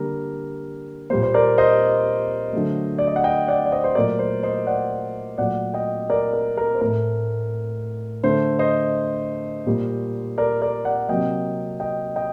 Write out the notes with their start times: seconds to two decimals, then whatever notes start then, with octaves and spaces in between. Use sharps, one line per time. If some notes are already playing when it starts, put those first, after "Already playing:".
Already playing: D3 G3 A#3 A#4
1.10 A#2 G3 A#3 C5
1.23 C5
1.34 A#4 D5
1.58 C5 D#5
2.53 D3 F#3 A3
2.99 D5
3.07 D#5
3.16 F#5
3.24 D#5 G5
3.48 D5 F#5
3.66 D5
3.72 C5 D#5
3.84 C5
3.95 A#2 F#3 A3 A#4 D5
4.19 C5
4.43 C5 D#5
4.67 D5 F#5
5.38 A#2 F#3 A3 D5 F#5
5.74 D#5 G5
6.10 A#4 D5
6.33 A#4
6.57 A#4
6.75 C5
6.81 A2 A3 A#4
8.23 D3 A3 C5
8.59 C5 D#5
9.66 A#2 G3 A#3
10.38 A#4 D5
10.62 A#4 D5
10.85 D5 F#5
11.09 C3 F#3 A#3 D#5 G5
11.80 D#5 G5
12.16 D#5 G5